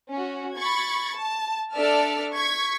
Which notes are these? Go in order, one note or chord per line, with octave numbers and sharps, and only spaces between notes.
C#4 F#4
B5 C#6 G#6 A6
A5
D4 A4 D5 E5 A5 F6
C#6 G#6 B6